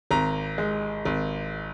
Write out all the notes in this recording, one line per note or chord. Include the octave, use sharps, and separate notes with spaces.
G#1 A#5
G#3
G#1